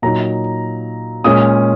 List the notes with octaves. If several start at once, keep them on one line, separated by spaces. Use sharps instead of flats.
A#2 F#3 D#4 A#5
A#2 G#3 C#4 D#6